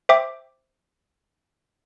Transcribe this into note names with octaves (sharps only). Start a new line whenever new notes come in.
C5 E5 G5 D6